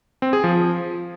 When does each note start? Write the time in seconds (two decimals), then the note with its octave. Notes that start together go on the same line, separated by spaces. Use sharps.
0.22 C4
0.33 G#4
0.44 F3